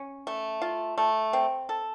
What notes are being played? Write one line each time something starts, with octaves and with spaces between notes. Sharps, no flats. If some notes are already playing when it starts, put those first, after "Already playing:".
Already playing: C#4
A3
F4
A3
C4
A4